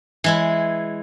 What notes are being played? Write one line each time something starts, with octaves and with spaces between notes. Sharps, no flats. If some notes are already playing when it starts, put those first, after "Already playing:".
E3 G#3 E4